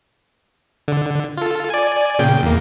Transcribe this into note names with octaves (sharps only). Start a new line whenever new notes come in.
D3
F4 A4
D5 G#5
A#2 C#3 G5
E2 A#3